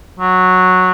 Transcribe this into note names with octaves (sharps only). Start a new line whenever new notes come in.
F#3